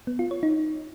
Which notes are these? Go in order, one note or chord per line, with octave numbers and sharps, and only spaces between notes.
B3
F4
C#5
D#4